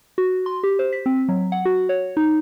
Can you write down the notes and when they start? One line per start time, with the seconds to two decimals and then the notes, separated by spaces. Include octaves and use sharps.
0.18 F#4
0.46 C6
0.63 G4
0.79 C5
0.93 B6
1.06 C4
1.29 F#3
1.52 F#5
1.65 F#4
1.89 C#5
2.17 D#4